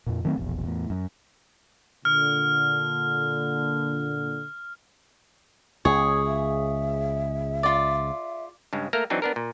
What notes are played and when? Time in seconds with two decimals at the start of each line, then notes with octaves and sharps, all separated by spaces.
0.07 F2 A#2
0.25 D#3 F#3 A3 C4
0.37 E1 A#1 E2
0.64 E2 A2
0.90 F#2
2.05 A#2 D3 F6
5.85 C#2 G#4 C#5
6.26 E5
7.63 F4 D5
8.73 G2 C#3 G#3
8.93 A3 A#3 A#4 A#5
9.10 E3 F#3 C4 D4 D#4
9.22 B3 D4 A#4
9.36 A#2